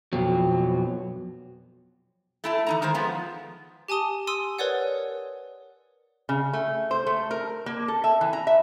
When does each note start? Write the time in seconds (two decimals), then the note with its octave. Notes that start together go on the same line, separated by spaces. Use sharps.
0.13 F2 B2 F#3
2.44 A3 E4 A5
2.66 E3 D#4 A#5
2.82 D#3 G#3 A#4 C5
2.94 F3 G#3 B3 F4
3.88 G4 G#5 A5 D#6 G7
4.27 G#5 C6 D#6 E6 D#7
4.59 A#4 B4 C#5 D5 F#5
6.29 C#3
6.53 A3
6.91 C5
7.07 A3
7.31 A#4
7.66 A#3
7.88 A4
8.04 E5
8.21 E3
8.33 A#5
8.47 E5